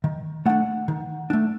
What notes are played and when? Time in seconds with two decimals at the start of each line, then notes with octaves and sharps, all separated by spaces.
0.04 D#3
0.46 A3 D4 F#5
0.88 D#3
1.30 A3 D4